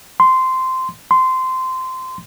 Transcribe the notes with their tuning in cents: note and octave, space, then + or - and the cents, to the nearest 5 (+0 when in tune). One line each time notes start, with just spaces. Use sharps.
C6 -10
C6 -15